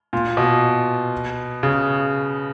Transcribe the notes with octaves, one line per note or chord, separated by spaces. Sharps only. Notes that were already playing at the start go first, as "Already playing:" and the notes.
A#2
B2
C#3